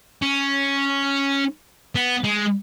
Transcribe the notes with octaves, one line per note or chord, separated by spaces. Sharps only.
C#4
B3
G#3